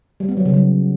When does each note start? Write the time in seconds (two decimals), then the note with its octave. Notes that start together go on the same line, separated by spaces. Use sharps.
0.20 G3
0.29 B3
0.37 F#3
0.45 C#3
0.54 F#3